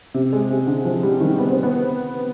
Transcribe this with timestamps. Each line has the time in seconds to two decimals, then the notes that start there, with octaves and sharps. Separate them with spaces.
0.14 C3
0.33 G#3
0.50 C3
0.67 D3
0.85 F3
1.03 G3
1.20 D#3
1.38 B3
1.50 C4
1.63 B3